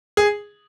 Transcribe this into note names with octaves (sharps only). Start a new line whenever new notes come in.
G#4